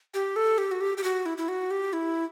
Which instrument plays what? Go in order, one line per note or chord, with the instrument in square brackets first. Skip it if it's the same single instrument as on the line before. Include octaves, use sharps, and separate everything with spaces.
[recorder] G4
A4
G4
F#4
G4
G4
F#4
E4
E4
F#4
G4
E4